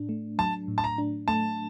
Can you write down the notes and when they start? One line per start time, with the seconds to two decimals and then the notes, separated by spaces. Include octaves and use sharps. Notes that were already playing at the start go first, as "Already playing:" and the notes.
Already playing: A2 D4
0.09 A3
0.39 F#3 A5
0.68 A2
0.78 A5
0.84 A#5
0.98 D4
1.28 A3 A5